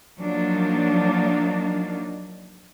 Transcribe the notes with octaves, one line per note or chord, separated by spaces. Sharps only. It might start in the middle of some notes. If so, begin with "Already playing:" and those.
F3 F#3 A#3 D4 D#4